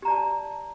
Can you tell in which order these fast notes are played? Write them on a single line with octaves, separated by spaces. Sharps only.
G4 A#5 D5 A5